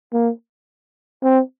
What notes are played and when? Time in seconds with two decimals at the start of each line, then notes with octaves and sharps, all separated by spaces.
0.13 A#3
1.23 C4